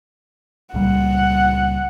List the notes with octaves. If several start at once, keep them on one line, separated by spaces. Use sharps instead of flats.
C#2 A#2 G3 F#5